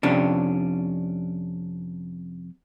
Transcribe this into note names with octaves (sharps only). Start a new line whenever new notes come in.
F2 C3 C#4 D4